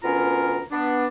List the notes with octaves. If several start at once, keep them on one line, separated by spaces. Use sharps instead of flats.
D2 B3 C#4 F4 A#4 A#5
B3 D4